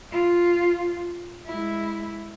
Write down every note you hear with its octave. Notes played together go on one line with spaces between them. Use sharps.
F4
G#3 E4